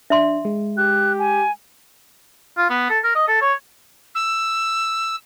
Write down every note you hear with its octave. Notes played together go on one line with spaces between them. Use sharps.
D4 E5 C6
G#3
G4 F#6
G#5
F4
B3
A4
A#4
D#5
A4
C#5
E6